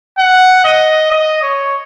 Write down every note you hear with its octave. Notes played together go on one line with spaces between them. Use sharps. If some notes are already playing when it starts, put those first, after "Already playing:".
F#5
D#5
D#5
C#5